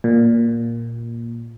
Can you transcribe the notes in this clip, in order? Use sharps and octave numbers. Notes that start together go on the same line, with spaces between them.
A#2